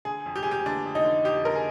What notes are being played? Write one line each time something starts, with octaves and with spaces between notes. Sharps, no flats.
D3 G#4
F2
G4
G#4
F2
G4
D3 D4
F2
D#4
D3
F2 G4
D3 A#4
G#4